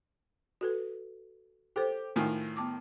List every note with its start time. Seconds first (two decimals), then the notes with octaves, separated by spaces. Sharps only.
0.61 F#4 A4 B4
1.76 G4 A4 C5
2.16 A2 D#3 F4 G#5
2.57 B3 A5 D6